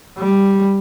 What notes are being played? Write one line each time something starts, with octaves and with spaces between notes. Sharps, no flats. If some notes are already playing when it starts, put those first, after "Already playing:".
G3